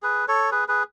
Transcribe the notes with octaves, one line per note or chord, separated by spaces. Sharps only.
G#4 B4
A4 C#5
G#4 B4
G#4 B4